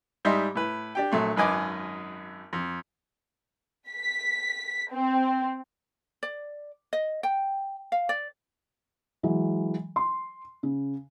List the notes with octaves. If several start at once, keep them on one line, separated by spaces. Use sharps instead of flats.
G#2 G3 D#5 E5 C6
A2 B4
D4 G4 G5
A#1 F#3 A3 C6
G#1 F#2 B4 D#5 G#5 D6
F2
B6
C4
D5
D#5
G5
F5
D5
E3 F#3 G#3
C6
C#3